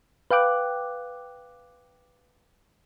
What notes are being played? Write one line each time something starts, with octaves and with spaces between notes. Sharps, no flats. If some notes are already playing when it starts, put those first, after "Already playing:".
B4 F5 G5 D6 F#6